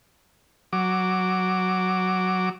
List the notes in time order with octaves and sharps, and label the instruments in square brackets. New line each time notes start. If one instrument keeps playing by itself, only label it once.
[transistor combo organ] F#3 D6